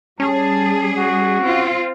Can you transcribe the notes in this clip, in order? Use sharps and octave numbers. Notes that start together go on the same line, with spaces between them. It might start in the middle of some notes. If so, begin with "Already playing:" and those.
G3 C#4 G#4 A5
F#4
C4 F4